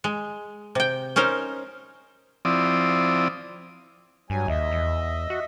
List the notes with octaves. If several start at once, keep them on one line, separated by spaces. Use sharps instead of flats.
G#3
C3 G5
C#4 D#4 A#4 C5
F3 C4 E4 D5 D#6
G2 F#3 G#5
D#2 D#5 E5
E2
F#4